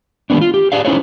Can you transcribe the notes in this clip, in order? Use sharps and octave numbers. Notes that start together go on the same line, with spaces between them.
D#3 G3 A#3 B3 D4
F4
G4
G4 G#4 D5 F5
C#4 D#4 E4 G#4 C5 C#5